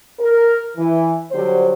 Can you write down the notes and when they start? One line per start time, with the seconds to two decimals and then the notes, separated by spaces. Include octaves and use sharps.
0.20 A#4
0.77 E3
1.32 D3 F#3 G3 C5